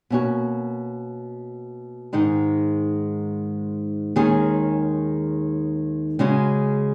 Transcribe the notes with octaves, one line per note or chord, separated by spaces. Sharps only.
B2 A#3 C#4 F#4
G#2 D#3 G#3 D#4
D#2 D#3 G#3 C#4 G#4
C#3 G#3 C#4 F#4